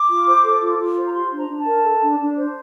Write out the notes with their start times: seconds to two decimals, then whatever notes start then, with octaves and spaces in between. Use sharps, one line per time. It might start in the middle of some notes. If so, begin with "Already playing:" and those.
Already playing: D6
0.09 F4
0.26 C5
0.43 A4
0.61 F4
0.78 F4
0.96 C5
1.05 A#5
1.14 G4 C6
1.32 D4
1.37 A#5
1.49 D4
1.60 A5
1.66 A#4
1.84 A4
2.01 D4
2.19 D4
2.37 C5